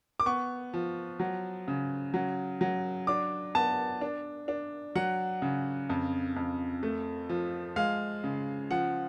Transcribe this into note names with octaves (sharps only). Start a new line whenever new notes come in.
D6
B3 C#6
F3
F#3
C#3
F#3
F#3
D4 D6
B3 A5
D4
D4
F#3 F#5
C#3
F2
F2
A3
F3
G#3 F5
C#3
F3 F#5